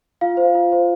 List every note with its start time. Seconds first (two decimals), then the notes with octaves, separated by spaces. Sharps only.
0.21 F4 F5
0.37 C5
0.55 F4
0.72 C5